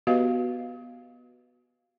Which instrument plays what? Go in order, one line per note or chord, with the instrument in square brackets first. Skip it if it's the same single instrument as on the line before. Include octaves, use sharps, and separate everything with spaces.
[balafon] B3 F#4 G4 B4 D#5 F5